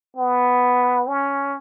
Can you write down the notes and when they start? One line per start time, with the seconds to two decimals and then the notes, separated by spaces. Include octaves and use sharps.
0.16 B3
1.08 C#4